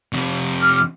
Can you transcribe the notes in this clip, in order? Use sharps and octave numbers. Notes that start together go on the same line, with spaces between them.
F2 C3
D6 F6